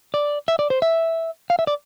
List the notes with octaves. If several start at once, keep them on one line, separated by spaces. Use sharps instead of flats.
D5
E5
D5
C5
E5
F5
E5
D5